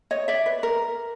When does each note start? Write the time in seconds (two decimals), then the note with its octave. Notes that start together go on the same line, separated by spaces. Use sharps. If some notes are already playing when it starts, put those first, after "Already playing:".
0.11 C#5 D#5
0.28 D5 E5
0.46 B4
0.63 A#4